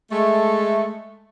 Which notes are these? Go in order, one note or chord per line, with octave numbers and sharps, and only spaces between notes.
G#3 A3